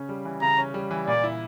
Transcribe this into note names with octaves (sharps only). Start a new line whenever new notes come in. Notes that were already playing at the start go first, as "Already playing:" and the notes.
Already playing: C#3 C#4
G3
E3
C#3 A#5
C#4
G3
E3
A#2 D5
E4